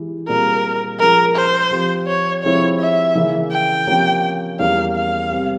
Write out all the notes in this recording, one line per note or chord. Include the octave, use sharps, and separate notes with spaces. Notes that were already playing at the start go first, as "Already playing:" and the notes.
Already playing: E3 G#3 E4 G4
A#2 G3 C4 F4 G#4 A#4
F3 G#3 C#4 F4 G#4 A#4
C5
F3 C4 G4
C#5
C3 F3 G#3 C4 E4 C#5
E5
C#3 E3 A#3 C#4
G5
C3 F3 A#3 C#4 G4
E2 E3 G3 A#3 C#4 F5
F5
C3 G3 C4